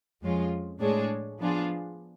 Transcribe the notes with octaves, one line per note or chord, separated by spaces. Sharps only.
F2 F3 G#3 C#4 F4
A2 G#3 D4 G#4 C#5
F3 B3 D4 F4 G#4